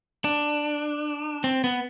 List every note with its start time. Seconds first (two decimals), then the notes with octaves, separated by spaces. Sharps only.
0.25 D4
1.44 C4
1.64 B3